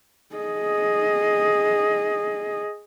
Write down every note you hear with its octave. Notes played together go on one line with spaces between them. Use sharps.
G#4 D#5